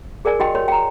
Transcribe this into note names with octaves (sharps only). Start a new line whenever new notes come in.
G#4 A#4 D5 G#5
F#4 G4 D#5 G5 C6
A#4 C#5 C6
G5 A#5